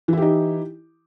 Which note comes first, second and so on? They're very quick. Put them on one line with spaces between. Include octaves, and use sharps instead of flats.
E3 E4 G4 D#4